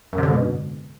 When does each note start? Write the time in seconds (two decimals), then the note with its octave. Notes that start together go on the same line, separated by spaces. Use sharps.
0.13 F#2
0.18 C3
0.23 D3
0.28 G#2
0.33 B2